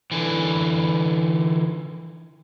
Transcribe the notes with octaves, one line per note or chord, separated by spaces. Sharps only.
D3 E3